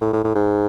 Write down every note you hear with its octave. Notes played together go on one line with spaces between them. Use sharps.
A2
A2
A2
G#2